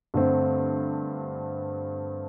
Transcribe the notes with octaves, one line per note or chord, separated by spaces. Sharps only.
G2 D3 A3 C4